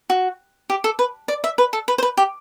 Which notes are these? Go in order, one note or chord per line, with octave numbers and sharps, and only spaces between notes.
F#4
G4
A4
B4
D5
E5
B4
A4
B4
C5
B4
G4